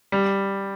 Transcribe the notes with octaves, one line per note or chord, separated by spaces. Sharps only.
G3